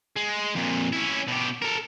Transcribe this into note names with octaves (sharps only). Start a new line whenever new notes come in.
G#3
F2 A#2
C#4 E4
B2 G4
A4 A#4